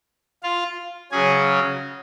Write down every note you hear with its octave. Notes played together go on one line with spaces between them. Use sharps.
F4 F5
C#3 F#3 C#4 G#4 G#5